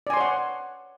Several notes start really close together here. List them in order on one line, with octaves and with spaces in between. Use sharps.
D5 G#5 C6 C#5 F#5